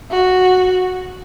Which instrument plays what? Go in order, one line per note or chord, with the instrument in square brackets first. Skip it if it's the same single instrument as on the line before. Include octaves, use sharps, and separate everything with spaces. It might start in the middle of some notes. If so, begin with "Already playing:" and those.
[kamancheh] F#4